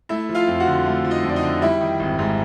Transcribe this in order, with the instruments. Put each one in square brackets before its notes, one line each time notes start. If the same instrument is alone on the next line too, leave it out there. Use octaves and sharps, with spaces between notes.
[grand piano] A3 E4 E5
F3
F4 F5
F2
F#4 F#5
D3
A3
F3
D#4 D#5
F2
D5
D#4 D#5
D3
G3 E4 E5
D#3
G#1
G#2